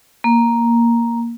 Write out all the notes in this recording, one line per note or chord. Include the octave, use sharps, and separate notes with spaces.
A#3